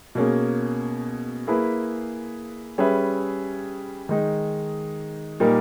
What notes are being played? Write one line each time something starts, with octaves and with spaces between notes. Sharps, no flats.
B2 A#3 C#4 G#4
A#3 E4 G#4 B4
G3 C#4 G#4 B4 E5
D#3 G#3 D#4
A#2 G3 A#3 D#4 A#4